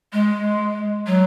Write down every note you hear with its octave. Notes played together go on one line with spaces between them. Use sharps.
G#3
F#3